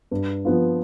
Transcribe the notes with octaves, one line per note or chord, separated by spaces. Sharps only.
G2
F3 B3 F4